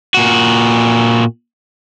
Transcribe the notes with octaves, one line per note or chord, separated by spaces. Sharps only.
A#2 F#4